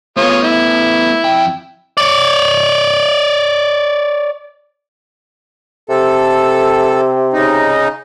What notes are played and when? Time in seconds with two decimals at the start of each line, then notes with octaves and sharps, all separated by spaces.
0.17 A3 B3 F4 C#5 D#6
0.43 E4
1.24 F2 G5
1.98 C#5 D5
5.89 C3 A4
7.33 C#3 D#4